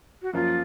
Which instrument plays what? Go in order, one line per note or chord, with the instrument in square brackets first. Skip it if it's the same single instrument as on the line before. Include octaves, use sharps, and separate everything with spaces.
[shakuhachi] F#4
[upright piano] F#2 F3 A#3 [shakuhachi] F4